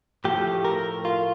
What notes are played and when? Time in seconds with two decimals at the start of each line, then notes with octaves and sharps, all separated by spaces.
0.24 A2 F3 A3 G4
0.65 A#4
1.05 F4